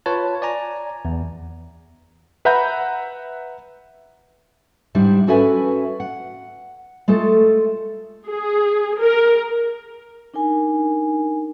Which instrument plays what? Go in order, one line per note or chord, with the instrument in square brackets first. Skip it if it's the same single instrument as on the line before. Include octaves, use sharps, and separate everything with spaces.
[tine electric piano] F4 B4 C#5 A5
D5 G#5 A#5
E2
[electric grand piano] B4 E5 F#5 A#5 B5 G6
[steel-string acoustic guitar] G#2 G3 D4 E4
C#4 F#4 A4 B4 E5 G#5
F#5
G#3 A3 F4 A4
[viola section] G#4
A#4
[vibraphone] D4 D#4 A#4 G#5